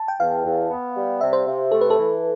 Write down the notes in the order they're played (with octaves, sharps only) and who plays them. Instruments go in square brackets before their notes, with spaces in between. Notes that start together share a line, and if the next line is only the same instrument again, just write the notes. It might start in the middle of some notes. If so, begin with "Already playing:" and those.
Already playing: [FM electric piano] A5
G5
[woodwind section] E2 [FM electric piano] F5
[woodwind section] E2
B3
G3
[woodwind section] C3 [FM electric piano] E5
[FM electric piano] C5
[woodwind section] C3
[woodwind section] A3 [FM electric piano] A4
[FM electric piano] B4
A4
[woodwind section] E3